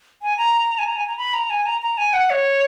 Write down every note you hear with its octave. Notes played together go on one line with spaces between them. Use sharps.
G#5
A#5
G#5
A#5
G#5
A#5
B5
A#5
G#5
A#5
A#5
G#5
F#5
C#5